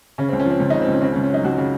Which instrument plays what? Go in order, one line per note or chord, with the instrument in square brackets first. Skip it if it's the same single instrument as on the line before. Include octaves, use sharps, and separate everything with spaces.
[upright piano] C#3 C#4
C4
C#2
C#4
F3 C4
C#2 C#4
D#4
C#3
C4
C#2 C#4
C#3 C4
C#4
C#2
C#4
F#3 D#4
C#2 F#4
C#3